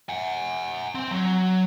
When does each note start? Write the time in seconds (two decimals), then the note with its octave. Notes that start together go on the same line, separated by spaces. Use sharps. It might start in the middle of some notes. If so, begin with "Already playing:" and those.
0.09 F#5 G#5
0.95 C4
1.11 F#3